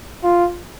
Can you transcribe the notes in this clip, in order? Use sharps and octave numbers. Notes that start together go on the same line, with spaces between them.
F4